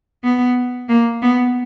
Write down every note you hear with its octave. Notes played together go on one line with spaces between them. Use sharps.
B3
A#3
B3